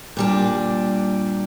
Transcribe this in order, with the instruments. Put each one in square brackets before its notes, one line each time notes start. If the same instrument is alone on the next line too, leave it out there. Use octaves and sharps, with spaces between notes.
[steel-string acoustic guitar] A#2 G3 D4